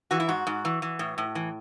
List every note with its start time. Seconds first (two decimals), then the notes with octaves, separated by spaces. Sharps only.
0.11 E3 F#4
0.20 E4
0.29 G#2 F#4
0.47 G#2
0.65 E3
0.82 E3
0.99 A2
1.18 A2
1.35 E3